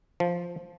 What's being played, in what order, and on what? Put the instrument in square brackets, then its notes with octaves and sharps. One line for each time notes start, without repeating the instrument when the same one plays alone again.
[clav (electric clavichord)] F3